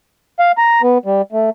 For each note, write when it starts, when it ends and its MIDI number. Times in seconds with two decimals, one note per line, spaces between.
0.40 0.52 77
0.58 0.82 82
0.82 0.98 59
1.05 1.22 55
1.32 1.50 57